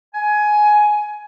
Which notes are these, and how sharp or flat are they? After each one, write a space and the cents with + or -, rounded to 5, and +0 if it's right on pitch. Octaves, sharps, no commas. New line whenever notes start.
G#5 +15